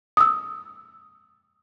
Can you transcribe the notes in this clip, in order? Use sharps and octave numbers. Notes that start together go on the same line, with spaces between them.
D#6 E6